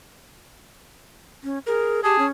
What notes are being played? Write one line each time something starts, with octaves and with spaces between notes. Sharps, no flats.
C#4
G#4 A#4
G4 G#4 A5
C#4